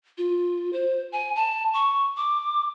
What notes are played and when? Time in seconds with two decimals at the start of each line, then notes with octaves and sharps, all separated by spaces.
0.18 F4
0.73 C5
1.12 G#5
1.36 A5
1.74 C#6
2.17 D6